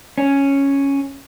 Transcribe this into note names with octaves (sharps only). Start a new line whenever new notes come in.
C#4